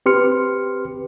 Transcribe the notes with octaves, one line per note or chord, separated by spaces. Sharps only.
C4 G4 B4 C6 F6 C#7